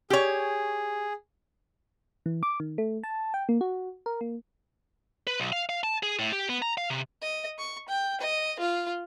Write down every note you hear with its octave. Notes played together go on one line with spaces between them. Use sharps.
G4 G#4 C#5
E3
D6
D#3
A3
A5
G5
A#3
F#4
A#4
A#3
B4
B1
F5
F5
A5
G#4
A2
G4
B3
A#5
F5
C3
D#5
C#6
G5
D#5
F4